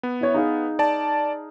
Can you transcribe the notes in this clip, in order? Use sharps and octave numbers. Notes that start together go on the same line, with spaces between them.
B3
E4 C#5
D#4 G#4 F5
D5 A5